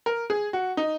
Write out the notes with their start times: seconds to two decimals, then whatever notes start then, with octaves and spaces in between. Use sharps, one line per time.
0.06 A#4
0.30 G#4
0.53 F#4
0.77 D#4